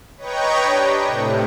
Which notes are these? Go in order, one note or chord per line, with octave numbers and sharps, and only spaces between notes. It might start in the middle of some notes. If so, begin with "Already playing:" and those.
B4 C#5 D#5 G5 A#5 C#6
D4 G4
A2 C3